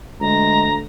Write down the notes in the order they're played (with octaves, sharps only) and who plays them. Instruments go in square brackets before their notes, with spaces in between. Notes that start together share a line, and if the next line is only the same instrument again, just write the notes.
[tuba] D2 [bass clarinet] G#3 [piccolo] A#5